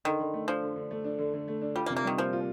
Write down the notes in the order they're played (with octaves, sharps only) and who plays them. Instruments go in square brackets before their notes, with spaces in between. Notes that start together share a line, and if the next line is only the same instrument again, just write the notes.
[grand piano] D3 [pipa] D#3
[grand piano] D3
A3
[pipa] F3 [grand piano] D4
[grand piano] D3
D3
A3
D4
D3
D3
A3
D4
[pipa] G3 [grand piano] F4
[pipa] A#3
[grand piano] C3
[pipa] A#3
[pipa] D#3 [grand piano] G3
[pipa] F3 [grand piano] A#3
[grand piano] F4